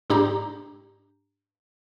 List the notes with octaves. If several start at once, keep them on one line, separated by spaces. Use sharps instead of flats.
G#2 D4 G4 A#5